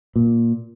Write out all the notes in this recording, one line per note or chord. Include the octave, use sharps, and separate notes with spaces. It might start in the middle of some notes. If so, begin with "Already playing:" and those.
A#2